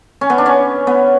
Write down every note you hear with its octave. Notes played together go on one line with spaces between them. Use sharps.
C#4
B3
D4
C#4
B3